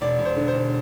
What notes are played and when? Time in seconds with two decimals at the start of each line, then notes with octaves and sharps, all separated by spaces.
0.01 E1 D5
0.18 E1
0.25 C5
0.36 D3
0.48 C5
0.54 E1